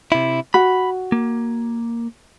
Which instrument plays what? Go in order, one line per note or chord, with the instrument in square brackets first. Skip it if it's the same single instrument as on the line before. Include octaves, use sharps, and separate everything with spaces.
[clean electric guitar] C3 E4
[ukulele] F#4 [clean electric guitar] B5
[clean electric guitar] A#3